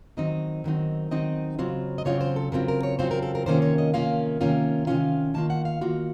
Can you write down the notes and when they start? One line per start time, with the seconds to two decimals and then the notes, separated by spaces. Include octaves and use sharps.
0.17 D#3 F#3 C4 D#4 D#5
0.64 D#3 F#3 C4 D#4
1.11 D#3 F#3 C4 D#4 D#5
1.59 C#3 F#3 C4 F4
1.98 D#5
2.05 C#3 F#3 C4 F4 C#5
2.21 C5
2.36 A4
2.52 C#3 F#3 C4 F4 A#4
2.68 A#4
2.83 C#5
2.99 C#3 F#3 C4 F4 C5
3.11 A#4
3.23 A4
3.35 A#4
3.46 C3 D#3 A#3 C#4 F4 C5
3.62 C#5
3.78 D#5
3.94 C3 D#3 A#3 C#4 F4 F5
4.41 C3 D#3 A#3 C#4 F4
4.87 C3 D#3 A#3 C#4 F4 F5
5.34 D#3 A#3 F4 A5
5.50 F#5
5.65 F5
5.81 D#3 A#3 F4 F#4